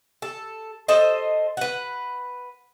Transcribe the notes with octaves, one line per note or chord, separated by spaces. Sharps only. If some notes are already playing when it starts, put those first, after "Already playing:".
A4
A4 C5 D#5
B4 F#5